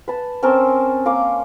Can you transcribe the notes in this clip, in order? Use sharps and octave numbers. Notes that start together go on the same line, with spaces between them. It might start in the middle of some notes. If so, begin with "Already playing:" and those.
B4 A5
C4 C#4 A#4 A5
A#3 C#4 D6